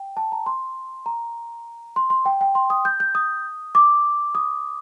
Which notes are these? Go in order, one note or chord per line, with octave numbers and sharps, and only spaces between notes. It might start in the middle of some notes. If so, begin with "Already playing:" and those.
Already playing: G5
A5
A#5
C6
A#5
C6
C6
G5
G5
C6
D#6
G6
G6
D#6
D6
D#6